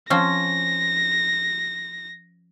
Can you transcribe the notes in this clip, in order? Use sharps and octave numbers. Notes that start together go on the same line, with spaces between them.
F3 C4 C#4 A#6